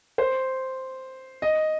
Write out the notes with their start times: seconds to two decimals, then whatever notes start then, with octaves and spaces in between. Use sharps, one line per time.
0.18 C5
1.42 D#5